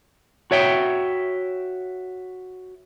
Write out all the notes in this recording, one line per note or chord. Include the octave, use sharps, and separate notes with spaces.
F#4 C#5 E5 G5